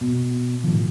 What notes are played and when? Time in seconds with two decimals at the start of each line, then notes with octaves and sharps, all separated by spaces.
0.01 B2
0.64 A2 D#3 F3